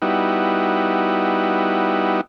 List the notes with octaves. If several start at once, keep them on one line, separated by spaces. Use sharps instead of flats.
G3 B3 D#4 E4 F#4